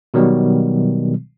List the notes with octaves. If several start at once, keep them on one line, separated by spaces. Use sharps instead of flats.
B2 D#3 F#3 G3 B3